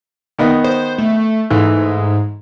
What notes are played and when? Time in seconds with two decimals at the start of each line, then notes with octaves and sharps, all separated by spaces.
0.39 D#3 B3 D#4
0.64 C5
0.98 A3
1.51 G#2 E3 A3